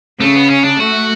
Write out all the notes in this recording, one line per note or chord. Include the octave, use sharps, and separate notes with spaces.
C#3 A3
B3
C#4
D4
A3 F#4